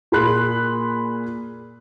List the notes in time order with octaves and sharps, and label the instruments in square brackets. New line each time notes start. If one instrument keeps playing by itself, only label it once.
[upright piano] A#2 A#3 G#4 B5 C6 F#6